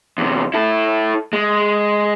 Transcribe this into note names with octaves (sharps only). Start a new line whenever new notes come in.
E2 C3
E4 A4
G#3